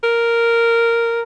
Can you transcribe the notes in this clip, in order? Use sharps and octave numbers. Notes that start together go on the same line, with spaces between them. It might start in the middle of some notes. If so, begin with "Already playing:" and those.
A#4